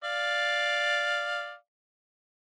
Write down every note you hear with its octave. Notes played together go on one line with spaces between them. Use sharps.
D5 F5